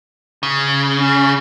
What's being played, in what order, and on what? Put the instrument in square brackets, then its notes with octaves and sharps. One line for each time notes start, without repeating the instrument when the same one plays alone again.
[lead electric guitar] C#3
[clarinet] C#4